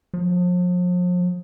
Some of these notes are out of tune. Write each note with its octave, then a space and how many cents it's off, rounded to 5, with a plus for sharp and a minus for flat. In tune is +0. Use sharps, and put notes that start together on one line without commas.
F3 +40